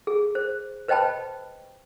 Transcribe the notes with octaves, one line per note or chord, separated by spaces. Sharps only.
G#4
C5
B4 C5 D#5 G5 A5 B5